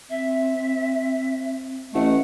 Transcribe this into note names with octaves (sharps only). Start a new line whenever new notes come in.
C4 E5
A1 A3 D#5 F#5